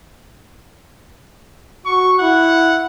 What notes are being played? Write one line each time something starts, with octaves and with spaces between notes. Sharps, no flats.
F#4 C#6
E4 F#5